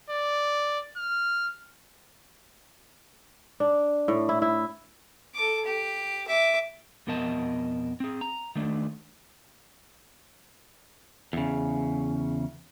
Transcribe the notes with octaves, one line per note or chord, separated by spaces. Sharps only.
D5
F6
D4
A2
E4
E4
A4 D6
G4
E5 D6
F2 B2 B3 A#4 D#5 A5
C4 G#4
A#5
D#3 A3 D4
E2 C#3